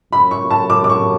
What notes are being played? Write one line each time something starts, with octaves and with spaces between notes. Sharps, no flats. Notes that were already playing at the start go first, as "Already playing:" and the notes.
F#2 B5
C#6
A5
D6
D6
C#6